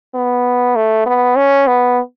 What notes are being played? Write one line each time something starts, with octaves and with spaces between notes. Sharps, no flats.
B3
A3
B3
C#4
B3